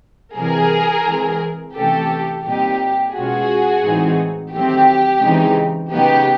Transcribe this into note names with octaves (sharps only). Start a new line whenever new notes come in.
C3 E3 G3 G#4 A#4
E3 G#3 C4
C3 E3 A3 C#4 G4 A4
A#2 G3 C4 D#4 G4
B2 G#3 C#4 F4 F#4 G#4
A2 E3 G#3 C4 D#4
D#3 F#3 A3 C4 G4
C#3 E3 G#3 C4 D#4
C#3 F#3 B3 D#4 G4